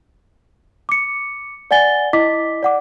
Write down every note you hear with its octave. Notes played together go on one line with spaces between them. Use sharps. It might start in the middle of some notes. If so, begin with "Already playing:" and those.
D6 C#7
D5 F#5 G#5 A6 G7
E4 D#5 D6 B6
D5 F#5 D6